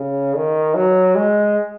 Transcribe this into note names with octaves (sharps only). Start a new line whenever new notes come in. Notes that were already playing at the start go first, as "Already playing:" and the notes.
Already playing: C#3
D#3
F#3
G#3